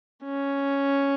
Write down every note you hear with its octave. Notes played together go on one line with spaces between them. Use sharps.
C#4